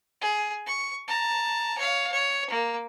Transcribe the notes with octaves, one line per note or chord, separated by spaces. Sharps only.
G#4
C#6
A5 A#5
C#5 F5
C#5
A#3